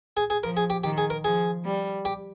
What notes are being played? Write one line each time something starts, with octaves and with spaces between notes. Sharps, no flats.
G#4
G#4
F3 A#4
G#4
G4
D#3 G4
G#4
A#4
F3 G#4
G3
G4